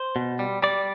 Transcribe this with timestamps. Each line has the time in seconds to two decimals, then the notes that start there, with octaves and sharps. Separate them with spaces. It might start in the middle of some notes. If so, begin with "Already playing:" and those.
Already playing: C5
0.16 B2
0.39 G3
0.62 G3 D5